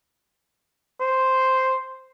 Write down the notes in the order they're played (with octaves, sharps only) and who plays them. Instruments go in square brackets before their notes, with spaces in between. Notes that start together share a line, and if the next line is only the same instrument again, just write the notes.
[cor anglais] C5